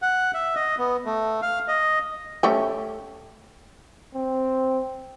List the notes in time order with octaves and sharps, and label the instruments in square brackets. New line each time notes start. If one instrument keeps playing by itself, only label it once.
[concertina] F#5
E5
D#5
B3
A3
F5
D#5
[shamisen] A3 C#4 G4
[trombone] C4